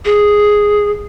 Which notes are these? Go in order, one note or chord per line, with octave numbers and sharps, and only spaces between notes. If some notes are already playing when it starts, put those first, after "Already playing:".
G#4